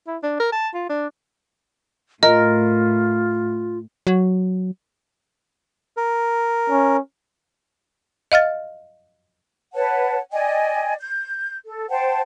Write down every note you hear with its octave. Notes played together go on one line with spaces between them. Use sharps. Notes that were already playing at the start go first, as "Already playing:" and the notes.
E4
D4
A#4
A5
F4
D4
A2 F4 A#4 D#5
F#3
A#4
C#4
D#5 F5 F6 A6
B4 C#5 F#5 A5
D5 D#5 G5 G#5
G6
A4
C5 F#5 G5 A5